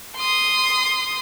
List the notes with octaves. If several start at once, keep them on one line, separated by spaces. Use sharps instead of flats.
C6 D#6